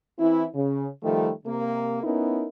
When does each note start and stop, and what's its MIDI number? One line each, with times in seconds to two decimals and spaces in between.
0.19 0.46 52
0.19 0.46 60
0.19 0.46 64
0.54 0.87 49
1.03 1.30 51
1.03 1.30 53
1.03 1.30 55
1.03 1.30 57
1.45 1.99 48
1.45 1.99 58
2.03 2.46 59
2.03 2.46 61
2.03 2.46 63
2.03 2.46 64
2.03 2.46 70